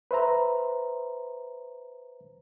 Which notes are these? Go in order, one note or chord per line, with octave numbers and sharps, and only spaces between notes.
B4 C5 E5 A#5